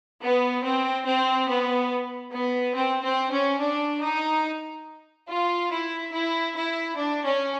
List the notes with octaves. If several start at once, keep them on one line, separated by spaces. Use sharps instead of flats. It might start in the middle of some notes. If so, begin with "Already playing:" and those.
B3
C4
C4
B3
B3
C4
C4
C#4
D4
D#4
F4
E4
E4
E4
D4
C#4